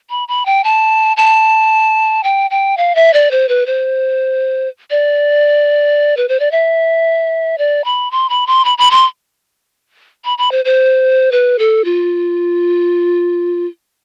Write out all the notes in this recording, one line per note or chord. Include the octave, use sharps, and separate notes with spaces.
B5
B5
G5
A5
A5
G5
G5
F5
E5
D5
C5
B4
C5
D5
B4
C5
D5
E5
D5
B5
C6
B5
C6
B5
B5
C6
B5
B5
C5
C5
B4
A4
F4